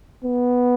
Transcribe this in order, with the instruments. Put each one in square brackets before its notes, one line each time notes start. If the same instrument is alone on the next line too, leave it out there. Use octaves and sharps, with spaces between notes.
[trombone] B3